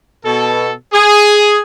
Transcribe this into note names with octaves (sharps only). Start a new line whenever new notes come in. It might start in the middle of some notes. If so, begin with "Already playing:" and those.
B2 A4
G#4